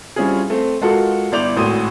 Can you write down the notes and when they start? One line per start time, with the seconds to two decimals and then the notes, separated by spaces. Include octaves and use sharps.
0.16 G3 C4 C#4 E4 F4 G#4
0.50 A3 C4
0.81 G#3 F4 F#4 A4 A#4
1.32 G1 E4 D5 G6 F7
1.56 G#1 A2 F#4 C6 D#6 D#7